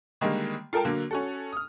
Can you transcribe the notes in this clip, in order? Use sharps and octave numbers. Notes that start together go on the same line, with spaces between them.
D3 D#3 G3 G#3 A#3
F4 A4 A#4 G5 A5
D3 F#3 A#3
C#4 F#4 A4
D#6 F6